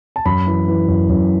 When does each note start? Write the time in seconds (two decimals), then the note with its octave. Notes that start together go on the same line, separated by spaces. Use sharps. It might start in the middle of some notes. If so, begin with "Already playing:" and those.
0.16 A5
0.25 F#2 B5
0.47 E3
0.68 E3
0.88 F#2
1.09 F#2